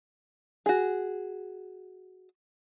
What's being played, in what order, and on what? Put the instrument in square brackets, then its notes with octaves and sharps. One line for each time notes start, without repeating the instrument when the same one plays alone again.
[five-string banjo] F#4 G#4